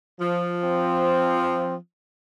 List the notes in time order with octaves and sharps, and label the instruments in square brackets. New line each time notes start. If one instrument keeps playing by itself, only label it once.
[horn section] F3
[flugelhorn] C4